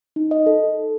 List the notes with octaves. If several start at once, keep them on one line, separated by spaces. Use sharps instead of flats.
D#4
D#5
A4